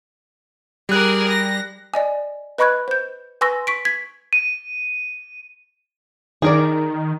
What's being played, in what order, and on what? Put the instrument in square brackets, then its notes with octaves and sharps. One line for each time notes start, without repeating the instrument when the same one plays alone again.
[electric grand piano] G3 F#6 [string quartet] G#4 A#4 D5
[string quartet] A#6
[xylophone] D5 D#5 G#5
B4 D#5 B5 C#6 F#6 G#6
C5 G6
B4 G#5 C6 C#6 E6 A#6
C#6 B6 D7
G#6 B6
[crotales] D#7
[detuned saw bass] D#3 [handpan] D#4 [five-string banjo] G#4 A#4 D5